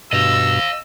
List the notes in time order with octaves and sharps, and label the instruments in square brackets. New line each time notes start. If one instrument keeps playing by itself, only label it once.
[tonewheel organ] G2 B2 [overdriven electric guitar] D#5 F5 [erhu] E6